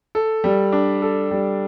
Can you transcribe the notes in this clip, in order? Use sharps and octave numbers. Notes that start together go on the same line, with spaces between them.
A4
G3
D4
A4
G3